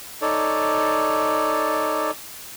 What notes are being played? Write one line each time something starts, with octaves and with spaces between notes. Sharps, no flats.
D#4 A4 C#5 D5